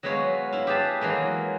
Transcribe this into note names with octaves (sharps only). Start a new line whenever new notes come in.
F#3 G#3 B3 B4 C#5 F5
E4 F5
G4 G#4 B4 A5
E3 F#3 G#3 A#3